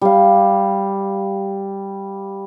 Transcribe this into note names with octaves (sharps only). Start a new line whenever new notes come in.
G3 F5